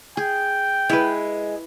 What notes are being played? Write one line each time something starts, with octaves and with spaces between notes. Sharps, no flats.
G#4 G5
G#3 E4 B4